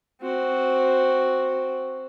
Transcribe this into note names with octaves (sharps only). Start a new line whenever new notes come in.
C4 F#4